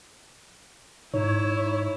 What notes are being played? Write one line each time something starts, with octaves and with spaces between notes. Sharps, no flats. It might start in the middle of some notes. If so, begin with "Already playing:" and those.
G#2 D#4 E4 C#5